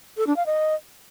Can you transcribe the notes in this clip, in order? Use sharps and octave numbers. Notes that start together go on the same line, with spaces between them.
A4
D4
F5
D#5